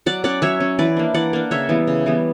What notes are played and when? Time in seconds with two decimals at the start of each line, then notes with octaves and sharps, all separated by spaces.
0.06 F#3 D5 F#5
0.24 C#4 D5 F#5
0.42 F#3 C#5 E5
0.60 C#4
0.79 E3 B4 D5
0.97 A#3 D4
1.14 E3 D5 F#5
1.33 A#3 D4
1.51 C#3 C#5 E5
1.69 E3 G3 B3
1.87 C#3
2.06 E3 G3 B3